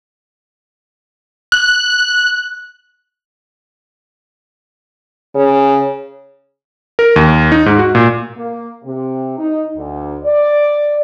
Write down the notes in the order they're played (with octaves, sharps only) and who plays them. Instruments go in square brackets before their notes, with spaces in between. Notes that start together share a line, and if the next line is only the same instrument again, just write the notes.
[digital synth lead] F#6
[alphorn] C#3
[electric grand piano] A#4
D#2
D#4
G#2
F#4
A#2
[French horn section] A#3
C3
D#4
D2
D5